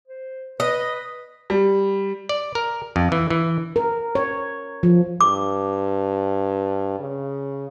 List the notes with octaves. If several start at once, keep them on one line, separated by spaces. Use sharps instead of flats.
C5
B4 D#5
G3
D5
A#4
F2
E3
E3
A#4
C#5
F3
G2 D6
C#3